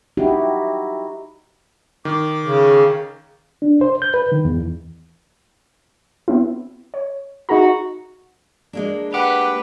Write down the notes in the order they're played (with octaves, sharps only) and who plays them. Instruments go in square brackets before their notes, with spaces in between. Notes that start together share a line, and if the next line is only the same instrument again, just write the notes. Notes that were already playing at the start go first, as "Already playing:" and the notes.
[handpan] D#4 E4 F#4 G4
[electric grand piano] D#3 [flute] D6
[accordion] C#3
[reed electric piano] D4
C5
G6
B4
D#3
E2
[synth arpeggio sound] B3 C4 E4
C#5
[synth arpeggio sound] D#4 G#4 A#5 [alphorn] F#4
[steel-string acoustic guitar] G#3 A#3 D4
[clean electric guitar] G4 [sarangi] B4 [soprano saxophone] F#5